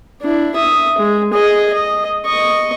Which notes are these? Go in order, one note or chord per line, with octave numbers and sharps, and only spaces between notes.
D4 E4
E5 D#6
G#3
G#4 D#5
D#5
D#5 C#6